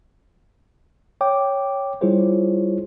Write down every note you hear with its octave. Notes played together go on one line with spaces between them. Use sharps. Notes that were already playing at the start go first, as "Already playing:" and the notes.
C#5 G5 D6
G3 E4 F4 G#4 C5 C#5